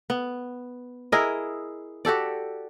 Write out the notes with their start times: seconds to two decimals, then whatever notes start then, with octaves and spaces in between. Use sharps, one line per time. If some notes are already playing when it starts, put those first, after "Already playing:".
0.10 B3
1.12 E4 G#4 A#4 D#5
2.05 F#4 G4 A4 D5